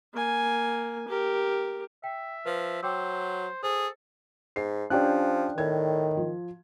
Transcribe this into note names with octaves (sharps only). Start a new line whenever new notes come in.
A#3 G#5
G4 A#4
E5 G5
F3 B4
F#3 C5 G5 D6 E6
G#4 A4 C5
G#2 C7
F3 C#4 D4 G4 D5 G5 F#6
A2 D#3 G#6
F3